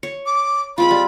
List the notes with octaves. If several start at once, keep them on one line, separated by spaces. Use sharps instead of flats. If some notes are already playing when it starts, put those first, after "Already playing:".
C#5
D6
G#3 C4 F4 B5
G3